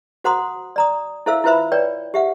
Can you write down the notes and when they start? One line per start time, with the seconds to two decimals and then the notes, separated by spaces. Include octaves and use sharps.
0.24 F#4 C5 F#5 A#5 C6 D#6
0.76 D5 A#5 D#6
1.26 E4 A4 C5 E5 F5 E6
1.44 E4 F4 B4 C5 E5 B5
1.72 B4 C#5 D5 G5
2.14 G4 E5 F#5